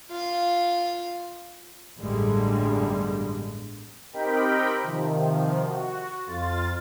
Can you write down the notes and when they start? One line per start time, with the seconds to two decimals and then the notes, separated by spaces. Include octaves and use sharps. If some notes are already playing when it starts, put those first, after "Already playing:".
0.11 F4 F5
2.00 A1 E2 G2 D3 G3 G#3
4.13 C4 D#4 G4 A#4 G5 B5
4.81 C3 D#3 F3
5.66 F#4
6.27 F2 F4 A6